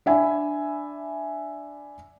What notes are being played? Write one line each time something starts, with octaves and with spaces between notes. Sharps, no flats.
D4 E5 G#5 B5